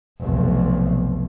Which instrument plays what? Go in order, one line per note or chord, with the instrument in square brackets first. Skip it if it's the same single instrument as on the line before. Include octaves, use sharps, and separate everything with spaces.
[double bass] F1 B1